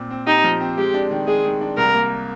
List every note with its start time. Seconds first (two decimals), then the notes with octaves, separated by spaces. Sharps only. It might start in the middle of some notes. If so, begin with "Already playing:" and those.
Already playing: A#2 C4
0.10 C4
0.27 D#4 G4
0.44 F3
0.61 C4
0.78 G#3 G4
0.94 D4
1.11 D#3
1.27 G#3 G#4
1.44 D#3
1.61 D4
1.78 C2 A#4
1.94 A#3